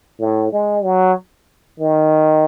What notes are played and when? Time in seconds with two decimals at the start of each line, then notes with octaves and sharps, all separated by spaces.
0.20 A2
0.53 G#3
0.84 F#3
1.80 D#3